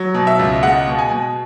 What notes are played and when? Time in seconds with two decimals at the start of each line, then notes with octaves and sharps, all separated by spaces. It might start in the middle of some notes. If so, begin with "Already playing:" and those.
Already playing: F#3
0.14 B2
0.27 E5
0.39 C#2
0.63 G#3 F#5
0.87 B2
0.99 G#5
1.11 B2